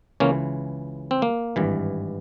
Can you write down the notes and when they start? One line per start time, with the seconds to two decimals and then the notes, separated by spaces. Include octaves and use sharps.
0.20 C#2 C#3 E3 A#3 C#4
1.11 C4
1.22 A#3
1.56 G#1 G2 E3